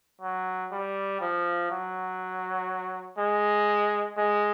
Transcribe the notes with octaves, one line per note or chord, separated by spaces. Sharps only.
F#3
G3
F3
F#3
G#3
G#3